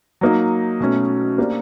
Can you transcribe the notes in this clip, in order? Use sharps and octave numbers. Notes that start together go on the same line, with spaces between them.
F#3 A#3 D#4
B2 F#3 A3 C#4
A#3 D4 G4 C5